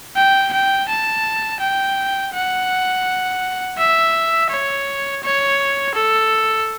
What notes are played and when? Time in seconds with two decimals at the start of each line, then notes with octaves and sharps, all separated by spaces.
0.16 G5
0.53 G5
0.89 A5
1.61 G5
2.34 F#5
3.78 E5
4.50 C#5
5.23 C#5
5.95 A4